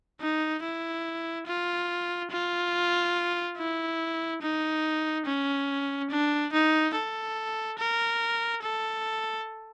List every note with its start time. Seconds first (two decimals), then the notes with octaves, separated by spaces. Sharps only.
0.20 D#4
0.63 E4
1.47 F4
2.31 F4
3.57 E4
4.42 D#4
5.26 C#4
6.10 D4
6.53 D#4
6.95 A4
7.79 A#4
8.63 A4